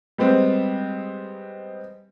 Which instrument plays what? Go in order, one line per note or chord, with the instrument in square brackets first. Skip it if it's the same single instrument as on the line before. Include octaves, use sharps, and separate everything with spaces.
[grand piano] G3 G#3 B3 C4